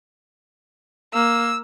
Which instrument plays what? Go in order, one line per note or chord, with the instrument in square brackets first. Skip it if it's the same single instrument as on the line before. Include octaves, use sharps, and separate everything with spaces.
[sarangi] A#3 [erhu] E6